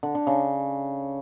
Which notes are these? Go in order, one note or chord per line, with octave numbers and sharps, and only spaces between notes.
D3
D3
C#3